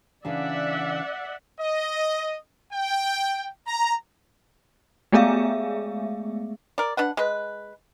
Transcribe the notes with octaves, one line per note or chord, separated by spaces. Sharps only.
C#3 E3 D4 D5 E5 F#5
D#5
G5
A#5
G#3 A3 B3 G#4 E5 F5
A#4 D5
D4 B4 F#5
G#3 B4